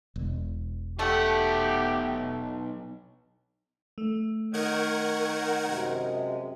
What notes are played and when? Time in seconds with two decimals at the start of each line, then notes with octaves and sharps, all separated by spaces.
0.16 E1
0.99 B1 A3 G4 F#5
3.98 A3
4.54 D#3 A#4 C#5 F#5 G#6
5.65 F#2 C3 G#3